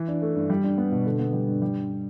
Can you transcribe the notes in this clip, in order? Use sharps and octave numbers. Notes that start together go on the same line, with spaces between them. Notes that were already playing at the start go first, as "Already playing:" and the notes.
Already playing: E3
D4
A3
G2
G3
D4
B3
B2
D3
B3
G3
G2
G3
D3
D4